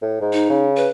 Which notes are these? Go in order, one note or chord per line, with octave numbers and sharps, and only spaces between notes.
A2
G#2
D#4
C#3
B4